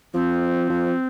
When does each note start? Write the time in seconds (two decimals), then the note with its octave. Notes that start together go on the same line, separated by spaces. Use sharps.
0.14 F3 C4
0.70 F3